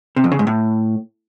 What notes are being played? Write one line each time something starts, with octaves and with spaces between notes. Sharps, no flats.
C3
F2
C#3
G#2
A2